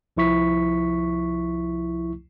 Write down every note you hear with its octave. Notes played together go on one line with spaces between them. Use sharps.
C2 F3 E4 C#6 B6